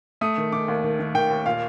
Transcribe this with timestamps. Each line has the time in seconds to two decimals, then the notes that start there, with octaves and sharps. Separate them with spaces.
0.21 A3 D#6
0.38 D#3
0.52 D#3 D6
0.68 D#2
0.84 D#3
0.99 D#3
1.14 D#3 G5
1.30 D#2
1.46 A#2 F5